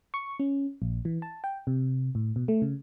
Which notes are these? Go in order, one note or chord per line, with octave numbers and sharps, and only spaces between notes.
C#6
C#4
A#1
E3
A5
G5
C3
A2
B2
A3
C#3